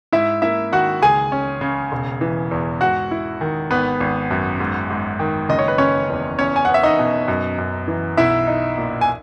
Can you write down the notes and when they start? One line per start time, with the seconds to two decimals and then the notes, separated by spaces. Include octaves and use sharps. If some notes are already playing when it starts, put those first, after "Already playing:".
0.12 G#2 E4 E5
0.42 A#3 E4 E5
0.72 D#3 F#4 F#5
1.02 C#2 G#4 G#5
1.32 C#4
1.61 C#3
1.92 E1
2.21 E3
2.51 E2
2.81 G#2 F#4 F#5
3.11 E4
3.41 D#3
3.71 G#1 B3 B4
4.00 G#1
4.31 F#2
4.60 G#2
4.90 G#2
5.20 D#3
5.49 F#1 D#5
5.59 C#5
5.68 B4
5.78 F#1 C#4 C#5
6.09 E2
6.39 E2 C#4 C#5
6.56 G#5
6.65 B3 F#5
6.74 E5
6.83 D#4 D#5
6.99 B2
7.28 F#2
7.58 F#2
7.88 E3
8.17 B1 E4 E5
8.47 D#4
8.78 A#2
9.01 G#5